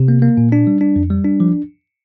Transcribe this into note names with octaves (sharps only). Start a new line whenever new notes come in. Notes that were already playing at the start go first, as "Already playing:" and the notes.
Already playing: C3
A#3
A#3
A#2
D4
G3
D4
F2
G3
D4
F3